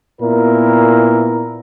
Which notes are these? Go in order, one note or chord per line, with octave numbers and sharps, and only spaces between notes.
A#2 B3 E4 A#4